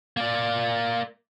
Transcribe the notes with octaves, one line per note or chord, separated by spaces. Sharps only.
A#3 D5